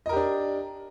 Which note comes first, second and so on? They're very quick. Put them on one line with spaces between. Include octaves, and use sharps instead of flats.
D#5 A#4 G4 D4